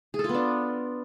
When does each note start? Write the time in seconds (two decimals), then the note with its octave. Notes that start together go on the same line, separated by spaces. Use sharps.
0.14 G#4
0.19 A4
0.24 F4
0.29 B3
0.34 D4